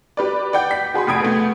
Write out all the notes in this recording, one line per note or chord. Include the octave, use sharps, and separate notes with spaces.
G4 B4 D5
D5 F#5 G5 G6
B6
F#4 G#4 B5 C6
F1 B5 D#6 G#6 D7
A3 B3